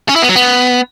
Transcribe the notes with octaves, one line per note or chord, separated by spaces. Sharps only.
C#4
E4
B3
F#3
B3